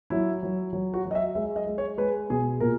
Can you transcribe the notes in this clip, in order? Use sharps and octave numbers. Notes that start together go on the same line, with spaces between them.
F#3 E4
F#3
F#3
F#4
F#3
D#5
E5
G#3 E5
D#5
G#3
C#5
G#3 B4
B2 G#4
A#2 A#4